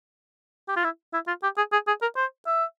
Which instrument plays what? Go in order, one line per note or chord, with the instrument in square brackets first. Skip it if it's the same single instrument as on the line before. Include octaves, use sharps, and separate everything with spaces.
[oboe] G4
F4
E4
E4
F4
G4
G#4
G#4
G#4
A#4
C5
E5